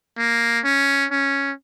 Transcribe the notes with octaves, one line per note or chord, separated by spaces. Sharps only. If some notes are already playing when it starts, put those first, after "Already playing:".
A#3
C#4
C#4